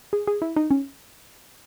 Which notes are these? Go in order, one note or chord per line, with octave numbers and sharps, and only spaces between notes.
G#4
G#4
E4
D#4
C#4